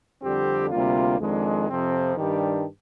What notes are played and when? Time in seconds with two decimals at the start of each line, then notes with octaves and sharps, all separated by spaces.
0.22 F2 D3 G3 C4 G4
0.70 D2 C3 G3 A#3 F4
1.18 F2 D#3 G#3 D4
1.67 F2 C3 F3 C4
2.16 G2 D#3 G3 D4 G4